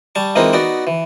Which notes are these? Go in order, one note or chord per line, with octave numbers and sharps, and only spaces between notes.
G3 A5 C#6
E3 G#3 A#3 C4 D#4 F4
B3 D#4 F#4 D5
E3